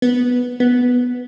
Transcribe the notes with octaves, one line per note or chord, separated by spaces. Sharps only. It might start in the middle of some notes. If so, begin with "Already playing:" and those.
B3
B3